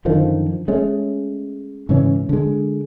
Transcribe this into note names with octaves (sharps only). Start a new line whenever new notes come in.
F#2 D3 D#3 F3
G#3 A3 C#4
G#2 C#3 E3 C#4
D3 G#3